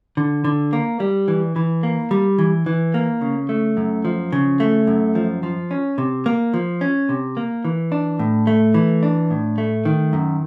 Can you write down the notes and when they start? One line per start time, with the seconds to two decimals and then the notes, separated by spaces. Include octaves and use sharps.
0.17 D3
0.44 D3
0.73 A#3
1.00 G3
1.28 E3
1.56 E3
1.83 A#3
2.11 G3
2.39 E3
2.66 E3
2.94 A#3
3.22 C#3
3.49 A3
3.77 F#2
4.05 F3
4.32 C#3
4.60 A3
4.87 F#2
5.15 F3
5.43 F3
5.71 C#4
5.98 C3
6.26 A#3
6.54 F3
6.81 C#4
7.09 C3
7.37 A#3
7.65 E3
7.92 D4
8.19 A2
8.47 A3
8.74 E3
9.03 D4
9.30 A2
9.58 A3
9.85 D#3
10.13 F#2